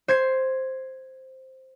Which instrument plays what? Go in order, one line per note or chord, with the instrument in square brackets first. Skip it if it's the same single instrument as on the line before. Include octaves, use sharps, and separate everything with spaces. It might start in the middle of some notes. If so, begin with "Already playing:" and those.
[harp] C5 G#6 C7